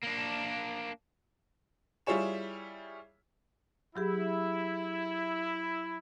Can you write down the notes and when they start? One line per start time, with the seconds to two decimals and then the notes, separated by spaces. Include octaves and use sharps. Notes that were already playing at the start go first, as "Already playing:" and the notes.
0.03 A#3 D4
2.06 G3 E4 F4 G#4 C#5 E7
3.96 F#3 E4 G4 G#4